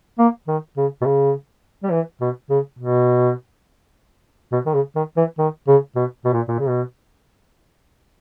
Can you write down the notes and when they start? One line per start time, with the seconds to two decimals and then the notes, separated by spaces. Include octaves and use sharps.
0.19 A#3
0.48 D#3
0.77 C#3
1.02 B2
1.05 C#3
1.83 G3
1.91 E3
2.21 B2
2.50 C#3
2.79 B2
4.52 B2
4.66 D#3
4.74 C#3
4.96 D#3
5.17 E3
5.38 D#3
5.68 C#3
5.96 B2
6.25 B2
6.33 A#2
6.48 A#2
6.59 C#3
6.69 B2